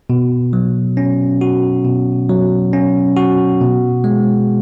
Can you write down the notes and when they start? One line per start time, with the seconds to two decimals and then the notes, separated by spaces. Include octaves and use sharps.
0.10 B2
0.53 F#3
0.97 C#4
1.41 F#4
1.84 B2
2.29 F#3
2.73 C#4
3.16 F#4
3.61 B2
4.04 G#3